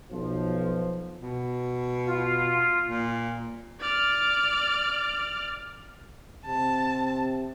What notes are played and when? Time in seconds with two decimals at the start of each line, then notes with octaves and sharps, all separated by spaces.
0.11 B1 F3
1.20 B2
2.04 F4
2.87 A#2
3.80 D5 F6
6.46 C3 A5